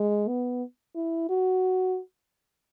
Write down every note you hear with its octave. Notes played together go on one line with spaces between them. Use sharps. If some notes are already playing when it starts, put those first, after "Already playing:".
Already playing: G#3
B3
E4
F#4